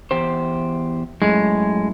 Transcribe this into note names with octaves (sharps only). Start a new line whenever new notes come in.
E2 G4 C5
F#2 A2 G#3